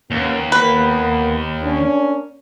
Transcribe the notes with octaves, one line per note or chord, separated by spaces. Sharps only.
D#2 A#3 B3 C#4
A#3 B3 B4
A#3 C#4 D4